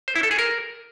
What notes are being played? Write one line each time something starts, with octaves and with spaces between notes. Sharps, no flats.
C5
E4
A4
G#4
A#4